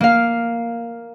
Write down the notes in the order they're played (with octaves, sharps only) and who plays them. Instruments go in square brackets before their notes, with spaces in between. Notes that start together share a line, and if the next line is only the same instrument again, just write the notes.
[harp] A#3 F5